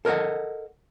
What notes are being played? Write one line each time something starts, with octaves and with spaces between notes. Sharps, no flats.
A4 A#4 C#5 D#5 F#5